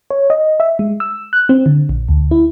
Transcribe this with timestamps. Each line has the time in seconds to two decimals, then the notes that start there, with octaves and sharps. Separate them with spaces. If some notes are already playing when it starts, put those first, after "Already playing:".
0.11 C#5
0.30 D#5
0.60 E5
0.79 G#3
1.00 E6
1.33 F#6
1.49 C4
1.66 D3
1.89 A#1
2.09 D2
2.31 E4